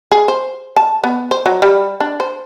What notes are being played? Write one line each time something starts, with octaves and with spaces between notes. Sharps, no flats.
G#4
C5
A5
B3
C5
F#3
G3
D4
C5